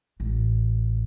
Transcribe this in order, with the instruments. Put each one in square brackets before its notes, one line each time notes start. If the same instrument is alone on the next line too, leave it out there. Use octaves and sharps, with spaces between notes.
[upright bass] A1